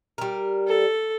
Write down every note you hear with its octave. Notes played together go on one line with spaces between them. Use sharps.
G3 A#4
A4